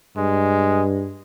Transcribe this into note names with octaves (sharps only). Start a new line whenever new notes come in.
G2 G#3